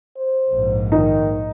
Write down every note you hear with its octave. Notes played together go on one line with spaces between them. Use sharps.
C5
A#1 G#2
D#3 D#4